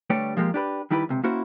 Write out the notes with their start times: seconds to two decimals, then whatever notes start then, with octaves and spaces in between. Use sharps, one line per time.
0.10 D3 G3 A3 G4 B4 C#5
0.37 F3 G#3 A#3 F#4 G4
0.54 D4 G4 B4
0.91 D#3 G3 E4 G4 A#4 B4
1.09 C#2 C3
1.24 A#3 C#4 E4 F#4 C5